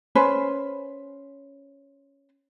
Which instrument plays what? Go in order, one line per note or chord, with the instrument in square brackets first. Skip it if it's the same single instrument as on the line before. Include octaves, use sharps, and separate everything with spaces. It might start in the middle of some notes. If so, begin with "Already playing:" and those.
[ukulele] C#4 B4 C5